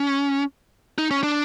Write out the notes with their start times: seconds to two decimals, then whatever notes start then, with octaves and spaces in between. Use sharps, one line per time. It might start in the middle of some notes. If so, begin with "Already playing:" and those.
Already playing: C#4
0.98 D#4
1.11 C#4
1.23 D4